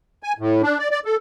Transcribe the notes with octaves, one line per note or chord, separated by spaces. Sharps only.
G#5
A2
D4
D5
D5
A4